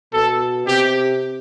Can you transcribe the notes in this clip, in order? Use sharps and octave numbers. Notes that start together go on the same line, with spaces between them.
B2 A4
C3 G4